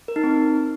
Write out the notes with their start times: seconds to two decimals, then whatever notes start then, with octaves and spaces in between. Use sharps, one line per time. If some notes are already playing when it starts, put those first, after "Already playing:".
0.08 A#4
0.16 D#4
0.24 C4